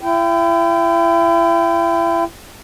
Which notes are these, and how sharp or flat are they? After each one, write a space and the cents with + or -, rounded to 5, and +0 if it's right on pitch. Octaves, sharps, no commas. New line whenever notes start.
E4 +40 G5 -10